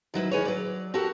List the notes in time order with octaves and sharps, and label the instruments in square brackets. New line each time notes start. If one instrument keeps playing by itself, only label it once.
[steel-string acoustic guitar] D#3 F#3 E4 B4
D#3 G#4 B4 C#5
F#3 D5
F#4 G4 A4 A#4